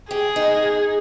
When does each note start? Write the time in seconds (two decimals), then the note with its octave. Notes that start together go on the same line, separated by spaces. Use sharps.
0.10 G4 G#4
0.36 D#4